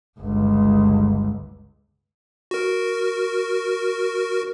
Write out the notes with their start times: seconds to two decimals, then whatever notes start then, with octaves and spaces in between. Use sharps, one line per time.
0.20 G1 C#2
2.51 F#4 A#4